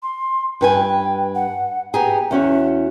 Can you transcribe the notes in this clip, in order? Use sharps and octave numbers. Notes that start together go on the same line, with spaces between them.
C6
G2 B4 G5 G#5
F#5
B3 G4 G#4 A#5
E2 C#4 F#4 E5